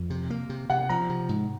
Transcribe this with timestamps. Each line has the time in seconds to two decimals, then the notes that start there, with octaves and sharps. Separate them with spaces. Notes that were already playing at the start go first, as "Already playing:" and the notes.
Already playing: F2
0.10 C3
0.30 A#3
0.49 C3
0.70 C3 F#5
0.89 F3 A#5
1.09 C3
1.29 G#2